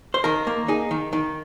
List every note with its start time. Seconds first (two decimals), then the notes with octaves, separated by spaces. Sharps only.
0.14 C5
0.24 D#3 A#4
0.47 A#3
0.68 D#4 G#4
0.91 D#3
1.13 D#3